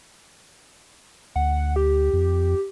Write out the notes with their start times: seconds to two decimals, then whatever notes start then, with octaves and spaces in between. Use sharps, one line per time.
1.36 D2 F#5
1.76 G4
2.13 F2